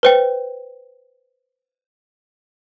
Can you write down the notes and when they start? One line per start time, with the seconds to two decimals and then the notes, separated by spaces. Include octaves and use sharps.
0.03 B4 C5 G5